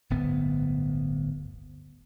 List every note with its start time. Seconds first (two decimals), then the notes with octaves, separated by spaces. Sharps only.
0.10 D1 G1 B3